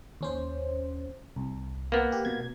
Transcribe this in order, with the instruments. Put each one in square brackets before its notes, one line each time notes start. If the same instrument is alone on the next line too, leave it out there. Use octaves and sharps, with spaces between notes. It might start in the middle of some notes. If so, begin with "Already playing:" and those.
[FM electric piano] D#2 C#4 C5
C2
[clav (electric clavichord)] A#3 B3
[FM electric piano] G4
B2 G#6